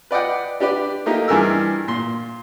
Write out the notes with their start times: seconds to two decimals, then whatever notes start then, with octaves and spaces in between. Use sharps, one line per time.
0.11 B4 D5 D#5 F#5 G5
0.60 D4 G4 B4 D5
1.06 A3 A#3 D#4 G4
1.28 G2 E3 G#4 A#4 E6
1.88 A#2 C6